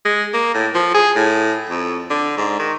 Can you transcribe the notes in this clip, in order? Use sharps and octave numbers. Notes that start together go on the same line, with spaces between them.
G#3
A#3
A2
F3
G#4
A2
F2
D3
G#2
D#3